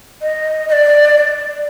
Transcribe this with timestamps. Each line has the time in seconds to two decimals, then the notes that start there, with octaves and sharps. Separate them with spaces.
0.22 D#5
0.68 D#5
0.72 D5